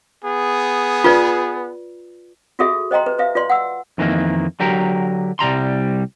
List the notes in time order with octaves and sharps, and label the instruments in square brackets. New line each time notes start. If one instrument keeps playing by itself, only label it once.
[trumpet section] B3 G#4
[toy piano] F4 B4 D5
F4 F#4 G#4 A4 E5
C5 D#5 G5 A#5 C6
B4
B4 E5 F5
F4 B4 D5 C6
F#5 E6
[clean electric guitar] F2 D#3 E3 A3 A#3
D3 F#3 G4 A#4
C2 G3 A#5 C6